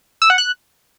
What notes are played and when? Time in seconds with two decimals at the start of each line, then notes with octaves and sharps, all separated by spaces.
0.22 E6
0.30 F#5
0.38 F#6